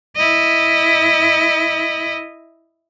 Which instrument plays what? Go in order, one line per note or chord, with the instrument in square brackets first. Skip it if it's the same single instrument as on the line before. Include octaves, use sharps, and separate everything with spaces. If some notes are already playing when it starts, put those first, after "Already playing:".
[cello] E4 D#5